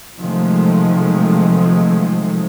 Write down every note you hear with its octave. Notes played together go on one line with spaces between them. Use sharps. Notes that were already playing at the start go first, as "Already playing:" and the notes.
C3 D#3 F3 F#3 G#3 A3